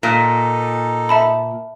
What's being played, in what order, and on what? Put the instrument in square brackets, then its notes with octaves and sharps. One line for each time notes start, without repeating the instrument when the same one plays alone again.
[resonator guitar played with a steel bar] A#2 [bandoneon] D#4 A4
[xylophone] E5 A5 B5